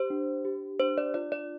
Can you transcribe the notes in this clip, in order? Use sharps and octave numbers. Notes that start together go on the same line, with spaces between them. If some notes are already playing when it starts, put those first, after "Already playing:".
Already playing: G4 C5
D4
G4
D4 C5
D5
F4 D5
D5